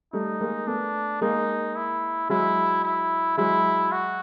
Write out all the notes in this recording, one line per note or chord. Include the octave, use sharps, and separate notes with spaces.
G3 A3 D#4
G#3 A#3
A3 B3 D4
G#3 A#3 D#4
E4
F#3 G#3 E4
E4
F#3 G#3 E4
F#4